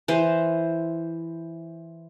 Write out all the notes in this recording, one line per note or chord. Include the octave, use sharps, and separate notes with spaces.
E3 C5